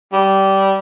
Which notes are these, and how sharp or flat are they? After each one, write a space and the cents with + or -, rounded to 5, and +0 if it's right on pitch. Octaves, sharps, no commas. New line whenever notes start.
G3 -15